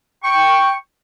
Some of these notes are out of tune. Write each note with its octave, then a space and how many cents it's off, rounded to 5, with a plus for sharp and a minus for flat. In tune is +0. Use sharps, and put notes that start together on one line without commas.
G5 +0 C#6 -5